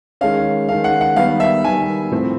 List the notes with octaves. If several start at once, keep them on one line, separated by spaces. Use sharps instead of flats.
D#3 G#3 C#4 F5
D#3 G#3 C#4 F5
F#5
F#5
D#3 G3 B3 F5
E5
D#3 G3 B3 G#5
A2 F3 A3 C4